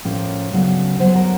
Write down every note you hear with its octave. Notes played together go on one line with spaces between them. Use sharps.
A2 F3 A#3 C#4 C#5
D2 C#3 F#3 B3
D2 D3 F#3 B3 C5
A#4